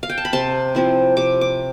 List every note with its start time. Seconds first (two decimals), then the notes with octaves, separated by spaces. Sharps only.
0.03 F5
0.10 G5
0.18 A5
0.25 B5
0.33 C3 A5 C6
0.75 F3 C4 E4
1.17 C3 D6
1.41 D6